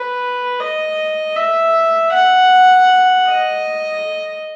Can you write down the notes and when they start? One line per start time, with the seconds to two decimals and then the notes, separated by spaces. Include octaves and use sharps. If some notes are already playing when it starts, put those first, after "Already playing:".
Already playing: B4
0.60 D#5
1.36 E5
2.13 F#5
3.29 D#5